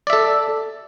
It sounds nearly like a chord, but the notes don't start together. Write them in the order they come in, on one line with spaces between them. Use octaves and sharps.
D5 E5 A4